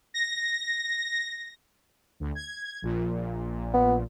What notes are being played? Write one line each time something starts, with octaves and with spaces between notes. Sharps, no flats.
A#6
D2
G#6
A#1 A#2
B3